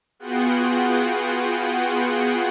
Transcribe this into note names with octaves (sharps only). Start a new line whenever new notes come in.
B3 F4 F#4 G#4 F#5 G5